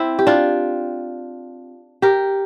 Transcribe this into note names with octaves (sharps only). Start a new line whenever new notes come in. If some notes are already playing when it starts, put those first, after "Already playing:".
Already playing: C4 E4
G4
D4 F4
G4 A#4